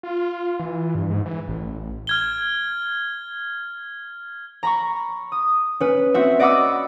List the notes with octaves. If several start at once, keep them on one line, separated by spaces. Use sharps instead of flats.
F4
E3
G2
G#2
E3
A1
F6 G#6 G7
A#5 B5 C#6
D#6
C#4 B4
C4 F#4 E5
D5 D#5 F#5 B5 D6 E6